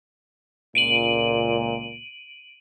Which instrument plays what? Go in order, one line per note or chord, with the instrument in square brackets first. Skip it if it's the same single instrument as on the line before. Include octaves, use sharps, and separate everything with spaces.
[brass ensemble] C#2 A#2 [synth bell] D7 D#7 F#7